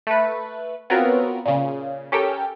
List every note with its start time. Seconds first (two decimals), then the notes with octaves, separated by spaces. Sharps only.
0.07 A3 B4
0.90 B3 C4 F4 F#4 A#4 C#5
1.45 A#2 C#3
2.12 C#4 G4 A4 A#4 G5